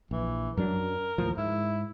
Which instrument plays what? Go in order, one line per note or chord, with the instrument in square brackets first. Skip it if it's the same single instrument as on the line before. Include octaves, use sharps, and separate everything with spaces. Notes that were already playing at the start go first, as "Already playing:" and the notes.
[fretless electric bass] A#1 [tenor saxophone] E3
[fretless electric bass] F#2 F#3 D4 [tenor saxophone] A#4
[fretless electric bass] D#2 A2 F3
[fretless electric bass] G#2 [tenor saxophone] E4